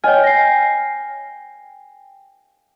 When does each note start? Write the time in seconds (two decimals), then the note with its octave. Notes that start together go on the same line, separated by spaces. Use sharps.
0.04 C#5 D#5 G5 G#5 F6
0.24 A#6 C7